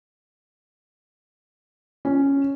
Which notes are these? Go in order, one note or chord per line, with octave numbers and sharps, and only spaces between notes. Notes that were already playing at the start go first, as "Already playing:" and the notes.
C#4